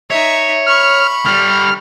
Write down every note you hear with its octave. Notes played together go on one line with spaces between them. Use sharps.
D#4 C#5 E5
B5 C#6 F6
D3 G3 F6